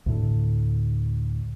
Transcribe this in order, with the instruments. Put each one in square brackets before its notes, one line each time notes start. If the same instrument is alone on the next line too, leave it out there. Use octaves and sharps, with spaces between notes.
[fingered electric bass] D2 A2 D3